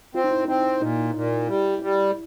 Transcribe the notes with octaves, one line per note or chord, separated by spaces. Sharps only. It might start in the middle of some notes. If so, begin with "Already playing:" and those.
C4 F4
D#4
E4
C4 D#4
A#2 D#4
A#2
G3 E4
G3